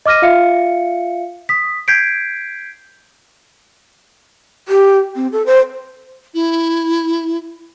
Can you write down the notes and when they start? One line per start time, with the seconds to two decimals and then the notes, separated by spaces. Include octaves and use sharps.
0.06 D#5 D6 F6 A#6 D#7
0.22 F4 E5 F5 C#7
1.49 D#6 B6
1.88 G6 G#6 B6 C7 D7
4.68 G4
5.16 C4
5.32 A4
5.46 C5
6.34 E4